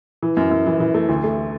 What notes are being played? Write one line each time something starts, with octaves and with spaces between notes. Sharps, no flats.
E3
F#2
F#2
E3
E3
A3
D2
A3